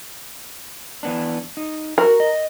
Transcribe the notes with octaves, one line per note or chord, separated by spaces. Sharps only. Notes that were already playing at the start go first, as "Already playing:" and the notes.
E3 B3 D4
D#4
F#4 A#4
D#5